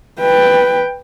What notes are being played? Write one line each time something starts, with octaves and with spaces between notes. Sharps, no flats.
B4 G5